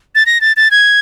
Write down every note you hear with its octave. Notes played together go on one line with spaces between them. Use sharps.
A6
A#6
A6
A6
G#6